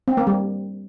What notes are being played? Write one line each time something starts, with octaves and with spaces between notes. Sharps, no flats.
C4
A#3
G3